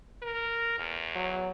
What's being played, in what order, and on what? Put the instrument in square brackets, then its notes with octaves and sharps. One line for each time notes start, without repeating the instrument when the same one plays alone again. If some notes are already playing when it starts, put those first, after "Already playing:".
[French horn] A#4
E2
[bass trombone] F#3